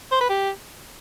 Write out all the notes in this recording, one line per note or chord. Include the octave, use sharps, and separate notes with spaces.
C5
B4
G4